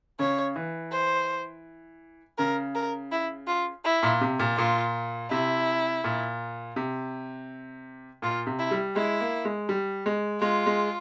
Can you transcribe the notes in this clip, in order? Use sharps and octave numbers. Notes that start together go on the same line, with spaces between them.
C#3 C#5
E3
C5
C#3 A#4
A#4
E4
F4
E4
A#2
C3
A#2
A#2 F4
C3 E4
A#2
C3
A#2 F4
C3
E4
G3
G#3 E4
A#3
G#3
G3
G#3
G#3 F4
G#3